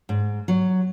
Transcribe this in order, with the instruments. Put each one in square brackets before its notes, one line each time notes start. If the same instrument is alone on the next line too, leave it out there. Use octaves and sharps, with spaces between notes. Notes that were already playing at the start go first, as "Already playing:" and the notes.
[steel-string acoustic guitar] G#2
F#3